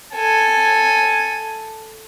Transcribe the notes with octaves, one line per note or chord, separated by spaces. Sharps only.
A4 G#5